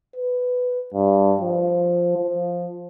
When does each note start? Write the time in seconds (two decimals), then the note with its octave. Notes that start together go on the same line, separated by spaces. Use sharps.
0.16 B4
0.94 G2
1.41 F3
2.18 F3